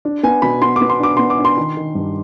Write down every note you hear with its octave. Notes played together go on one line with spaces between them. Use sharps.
D4
B3 G#5
B2 B5
B3 C6
D6
B3
C6
D4 D6
B3 C6
D6
D4
C6
D#3
D#3
G2